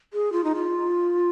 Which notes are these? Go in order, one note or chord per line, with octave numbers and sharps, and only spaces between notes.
G#4
F4
D#4
F4